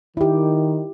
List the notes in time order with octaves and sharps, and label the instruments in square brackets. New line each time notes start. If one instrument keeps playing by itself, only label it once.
[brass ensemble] D#3 [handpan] E4 G4